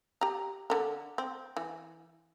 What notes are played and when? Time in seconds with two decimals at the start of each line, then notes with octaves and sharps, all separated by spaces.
0.21 G4 A#5
0.70 D3 A#4
1.18 C4
1.57 E3